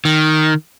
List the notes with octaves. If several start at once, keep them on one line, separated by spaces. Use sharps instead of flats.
D#3